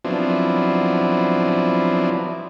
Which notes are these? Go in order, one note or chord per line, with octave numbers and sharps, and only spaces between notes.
F3 F#3 B3 C4 D4 E4